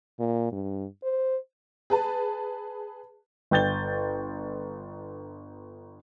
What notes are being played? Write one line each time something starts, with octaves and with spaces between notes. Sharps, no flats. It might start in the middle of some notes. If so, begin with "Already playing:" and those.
A#2
G2
C5
G#4 B4 A5
G1 G5 G6 A6 G7